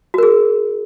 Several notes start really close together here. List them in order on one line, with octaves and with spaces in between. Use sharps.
F#4 A#4 G#4